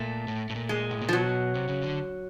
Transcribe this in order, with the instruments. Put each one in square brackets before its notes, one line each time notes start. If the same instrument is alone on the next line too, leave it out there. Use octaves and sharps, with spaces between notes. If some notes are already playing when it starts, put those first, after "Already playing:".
Already playing: [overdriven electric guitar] A#2 [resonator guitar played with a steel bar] A3
[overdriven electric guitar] A2
A2
A#2
[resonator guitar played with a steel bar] G#3
[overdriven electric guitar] A2
A#2
[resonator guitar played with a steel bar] F3
[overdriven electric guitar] B2 [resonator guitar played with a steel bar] F#3
[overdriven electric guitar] C3
C#3
D3